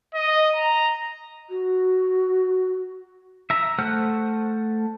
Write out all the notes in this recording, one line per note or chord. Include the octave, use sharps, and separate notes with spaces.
D#5
A#5
F#4
E5 A#5
A3 C5 F#5 F6 F#6